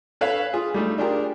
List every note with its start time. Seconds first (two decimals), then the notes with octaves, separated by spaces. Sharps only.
0.21 A4 B4 C#5 F5
0.53 F4 G#4
0.74 G3 A3 D#4
0.98 D4 F4 G4 G#4 A#4